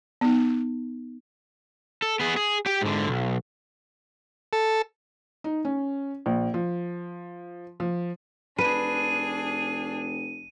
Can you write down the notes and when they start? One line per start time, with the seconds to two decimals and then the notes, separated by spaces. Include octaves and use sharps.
0.21 B3 D#4
2.02 A4
2.20 B3 G#4
2.37 G#4
2.66 G4 G5
2.81 G#2 D3
3.09 B1
4.53 A4
5.44 D#4
5.65 C#4
6.26 A#1
6.54 F3
7.80 F3
8.59 F1 D4 G#4 B4 D#7